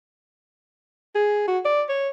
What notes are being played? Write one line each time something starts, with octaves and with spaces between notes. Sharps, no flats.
G#4
F#4
D5
C#5